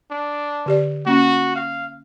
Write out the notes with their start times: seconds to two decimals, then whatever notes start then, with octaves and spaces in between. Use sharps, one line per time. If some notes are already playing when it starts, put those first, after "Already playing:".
0.11 D4
0.66 D3 G4 D5
1.06 A#3 C#4 F#4
1.56 F5